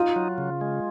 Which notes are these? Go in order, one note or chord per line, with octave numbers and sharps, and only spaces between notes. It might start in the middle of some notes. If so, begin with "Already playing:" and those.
Already playing: D#4 F4
F#3
C#3
G#3